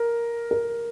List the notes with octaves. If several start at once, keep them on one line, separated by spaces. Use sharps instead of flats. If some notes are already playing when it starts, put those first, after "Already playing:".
Already playing: A#4
A#4